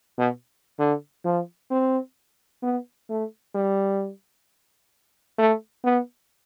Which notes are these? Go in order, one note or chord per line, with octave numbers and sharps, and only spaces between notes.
B2
D3
F3
C4
B3
A3
G3
A3
B3